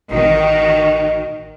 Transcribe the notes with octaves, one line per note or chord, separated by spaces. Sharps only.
A1 D#3 F#4 D#5